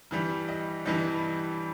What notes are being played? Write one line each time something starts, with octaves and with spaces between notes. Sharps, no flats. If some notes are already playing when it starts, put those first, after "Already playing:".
G2 E3 G3
D#5
G2 E3 G3 D#5